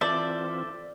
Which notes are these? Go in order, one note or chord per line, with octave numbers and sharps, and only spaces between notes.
E3 C4 F4 A4 C5 D5 E5